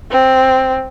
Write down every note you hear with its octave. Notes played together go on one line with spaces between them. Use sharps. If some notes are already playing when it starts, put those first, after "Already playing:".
C4